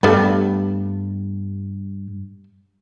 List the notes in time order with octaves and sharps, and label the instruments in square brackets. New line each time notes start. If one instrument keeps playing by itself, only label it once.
[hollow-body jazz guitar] G2 [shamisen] G3 A3 B3